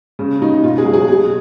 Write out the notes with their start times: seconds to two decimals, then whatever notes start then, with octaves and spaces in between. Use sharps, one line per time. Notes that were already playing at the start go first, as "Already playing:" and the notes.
0.19 C#3
0.42 C#3 D#4
0.63 B2 F4
0.78 G#4
0.85 F#3
0.93 G#4
1.08 B2 G#4